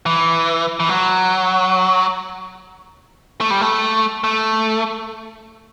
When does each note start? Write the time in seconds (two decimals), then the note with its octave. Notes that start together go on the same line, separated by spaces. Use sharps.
0.06 E3
0.80 E3
0.89 F#3
3.41 A3
3.51 G3
3.61 A3
4.24 A3